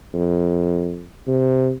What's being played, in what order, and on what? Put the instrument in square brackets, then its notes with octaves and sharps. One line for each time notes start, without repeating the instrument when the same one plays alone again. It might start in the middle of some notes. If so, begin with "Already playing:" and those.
[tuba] F2
C3